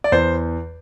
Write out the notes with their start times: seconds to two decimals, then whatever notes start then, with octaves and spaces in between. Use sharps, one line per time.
0.04 D5
0.12 E2 C5